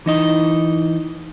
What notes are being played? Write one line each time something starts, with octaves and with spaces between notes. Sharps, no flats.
E3 D#4 D#5